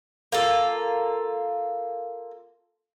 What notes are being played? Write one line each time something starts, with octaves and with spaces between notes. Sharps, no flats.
A#3 F4 A4